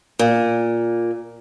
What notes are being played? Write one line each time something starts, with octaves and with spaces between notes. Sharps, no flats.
A#2